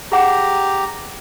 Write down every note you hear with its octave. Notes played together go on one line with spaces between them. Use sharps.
G4 G#4 F#5 A#5